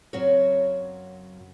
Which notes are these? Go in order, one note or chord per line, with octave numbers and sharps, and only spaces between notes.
F#2 C#3 F#3 C4 F#4 C#5